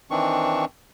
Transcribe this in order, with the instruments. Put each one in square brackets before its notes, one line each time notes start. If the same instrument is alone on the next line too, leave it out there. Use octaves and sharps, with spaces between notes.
[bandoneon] D#3 E3 C4 D4 C#6